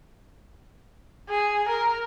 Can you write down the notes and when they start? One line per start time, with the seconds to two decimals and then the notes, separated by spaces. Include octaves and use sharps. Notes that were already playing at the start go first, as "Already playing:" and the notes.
1.30 G#4
1.69 A#4